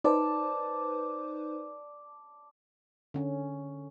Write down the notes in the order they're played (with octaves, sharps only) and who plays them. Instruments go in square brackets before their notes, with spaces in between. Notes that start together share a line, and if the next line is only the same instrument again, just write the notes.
[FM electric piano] D#4 B4 C5 [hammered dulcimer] D5 A5
[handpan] D3 C#4